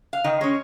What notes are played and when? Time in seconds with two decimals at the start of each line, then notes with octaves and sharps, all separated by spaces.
0.13 F5
0.24 D#3 D#5
0.41 G#3 C#4 C#5